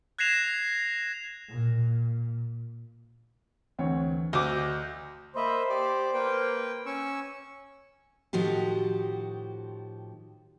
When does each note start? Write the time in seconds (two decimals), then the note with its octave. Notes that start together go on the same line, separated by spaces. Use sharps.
0.19 F#6 G#6 A#6 C7 E7 F7
1.50 A#2
3.79 D2 E3 C4 C#5
4.33 D2 F#4 D#5 E5 D6 G6
5.36 A#3 C5 D#5 E5 B5
5.70 G4 D5
6.14 A#3 B4 G5
6.86 C#4 C#6 E6
8.33 A2 D#3 F3 F#4 G4